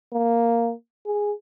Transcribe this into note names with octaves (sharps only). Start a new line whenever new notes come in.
A#3
G#4